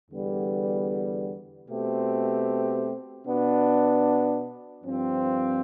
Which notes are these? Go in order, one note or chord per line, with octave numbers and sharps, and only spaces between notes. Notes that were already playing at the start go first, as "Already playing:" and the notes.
E2 D3 G3 B3
B2 A3 C4 G4
B2 B3 D4
G2 F3 C4 F4